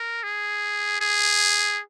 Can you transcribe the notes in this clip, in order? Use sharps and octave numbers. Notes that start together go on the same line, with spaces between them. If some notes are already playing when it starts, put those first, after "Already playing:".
Already playing: A#4
G#4
G#4